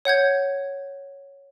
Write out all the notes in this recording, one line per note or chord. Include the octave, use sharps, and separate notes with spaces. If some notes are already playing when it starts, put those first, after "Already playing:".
C#5 F#5 G6 G#6